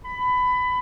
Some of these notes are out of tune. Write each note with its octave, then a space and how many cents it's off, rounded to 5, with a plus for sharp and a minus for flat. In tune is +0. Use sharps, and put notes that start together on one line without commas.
B5 +20